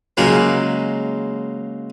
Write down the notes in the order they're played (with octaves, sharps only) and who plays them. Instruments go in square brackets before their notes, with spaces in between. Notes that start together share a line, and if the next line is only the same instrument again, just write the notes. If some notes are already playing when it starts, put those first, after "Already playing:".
[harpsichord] C#3 F#3 G#3 A#3